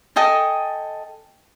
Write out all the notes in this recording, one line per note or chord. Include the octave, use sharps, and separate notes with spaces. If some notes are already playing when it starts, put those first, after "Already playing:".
A4 D#5 G5 G#5